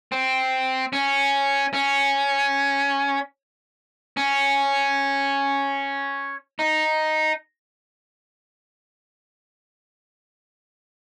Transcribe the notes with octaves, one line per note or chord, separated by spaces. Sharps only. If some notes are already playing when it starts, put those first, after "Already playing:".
C4
C#4
C#4
C#4
D#4